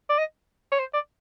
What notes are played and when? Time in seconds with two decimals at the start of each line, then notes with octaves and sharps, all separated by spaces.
0.09 D5
0.19 D#5
0.72 C#5
0.79 C5
0.94 D5